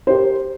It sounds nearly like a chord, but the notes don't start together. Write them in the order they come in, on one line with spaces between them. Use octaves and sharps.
C5 G4 A#4